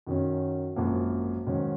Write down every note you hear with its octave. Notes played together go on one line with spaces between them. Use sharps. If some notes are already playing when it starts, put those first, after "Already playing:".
F#2 D#3 F#3 C#4
G#1 F#2 F3 A#3
G#2 D#3 F#3 C#4